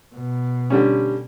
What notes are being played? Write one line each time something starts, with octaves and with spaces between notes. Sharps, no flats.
B2
D3 G3 C#4